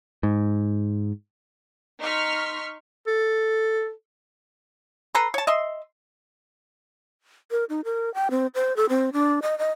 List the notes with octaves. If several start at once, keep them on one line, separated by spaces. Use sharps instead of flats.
G#2
D#4 C6 C#6 F6 B6
A4
A4 B4 A#5 C6
C#5 A5
D#5 E5 C6
A#4
D#4
A#4
G5
C4
C5
A4
C4
D4
D#5
D#5